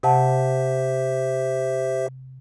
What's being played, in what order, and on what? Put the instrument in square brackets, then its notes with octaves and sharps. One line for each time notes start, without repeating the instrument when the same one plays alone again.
[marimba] C3 F#5 A5 [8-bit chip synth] G4 C5 E5